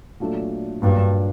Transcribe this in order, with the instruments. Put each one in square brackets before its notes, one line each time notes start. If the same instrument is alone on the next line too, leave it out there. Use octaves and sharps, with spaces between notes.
[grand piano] A#2 F#3 A3 D4 A4
[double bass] G2 [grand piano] A#2 F#3 A#3 D4